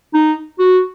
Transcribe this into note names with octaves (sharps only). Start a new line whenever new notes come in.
D#4
F#4